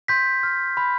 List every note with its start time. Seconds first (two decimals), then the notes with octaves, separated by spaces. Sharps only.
0.08 C6 G6 B6
0.43 F6
0.77 B5